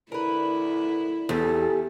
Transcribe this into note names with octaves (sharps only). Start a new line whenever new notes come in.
D3 E4 A#4 B4
E2 G4 A4 G#5